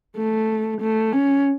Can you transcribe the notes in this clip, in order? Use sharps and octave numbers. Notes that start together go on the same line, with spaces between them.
A3
A3
C#4